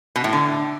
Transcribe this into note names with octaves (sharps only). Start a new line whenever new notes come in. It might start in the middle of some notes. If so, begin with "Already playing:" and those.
B2
A2
D3